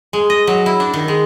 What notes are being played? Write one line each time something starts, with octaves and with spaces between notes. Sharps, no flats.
G#3
D#5
F#3
E4
D4
D#3
G#3